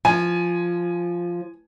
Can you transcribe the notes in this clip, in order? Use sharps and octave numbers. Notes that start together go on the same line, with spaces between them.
F3 G#5